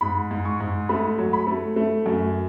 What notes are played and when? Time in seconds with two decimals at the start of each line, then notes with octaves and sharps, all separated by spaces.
0.01 G#2 B5
0.31 G#2
0.45 C#6
0.60 G#2
0.89 A3 B5
1.18 F#3
1.33 B5
1.47 A3
1.76 A3
2.06 F#2